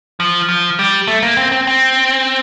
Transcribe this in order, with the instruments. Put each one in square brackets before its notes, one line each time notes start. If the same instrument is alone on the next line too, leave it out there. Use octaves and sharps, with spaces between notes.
[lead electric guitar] F3
F3
G3
A3
A#3
C4
C4
C4